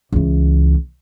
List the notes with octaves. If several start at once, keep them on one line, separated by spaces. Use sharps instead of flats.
C#2 E3